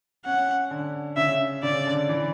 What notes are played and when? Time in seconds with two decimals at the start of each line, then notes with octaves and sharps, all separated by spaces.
0.25 C#4 F#5
0.71 D3
1.17 C#3 E5
1.63 C#3 D5
1.86 D3
2.09 E3